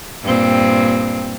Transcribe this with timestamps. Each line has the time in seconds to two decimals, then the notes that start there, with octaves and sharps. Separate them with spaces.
0.23 G2 A#2 C4